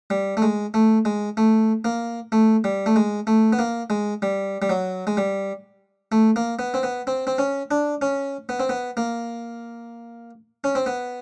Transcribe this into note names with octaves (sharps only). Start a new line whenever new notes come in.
G3
A3
G#3
A3
G#3
A3
A#3
A3
G3
A3
G#3
A3
B3
A#3
G#3
G3
G3
F#3
G#3
G3
A3
A#3
B3
C4
B3
C4
C4
C#4
D4
C#4
B3
C4
B3
A#3
C#4
C4
B3